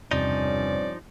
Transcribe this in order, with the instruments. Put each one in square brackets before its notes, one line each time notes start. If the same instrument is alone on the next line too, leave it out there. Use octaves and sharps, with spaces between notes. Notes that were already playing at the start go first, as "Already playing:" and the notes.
[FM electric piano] E2 C3 [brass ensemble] G2 C4 C#4 [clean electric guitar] F3 D#4 [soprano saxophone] D5